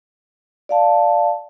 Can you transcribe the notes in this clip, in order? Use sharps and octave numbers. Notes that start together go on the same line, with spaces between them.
D5 F5 A5